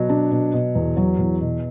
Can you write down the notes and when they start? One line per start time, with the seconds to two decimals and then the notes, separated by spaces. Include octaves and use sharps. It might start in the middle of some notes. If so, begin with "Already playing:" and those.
Already playing: B2 F#3
0.09 D4
0.31 B2
0.53 B2
0.75 E2
0.97 F#3
1.19 E2
1.41 B2